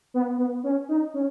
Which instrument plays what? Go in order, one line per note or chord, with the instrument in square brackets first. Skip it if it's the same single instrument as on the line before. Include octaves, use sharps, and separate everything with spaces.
[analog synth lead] B3
B3
C#4
D#4
C#4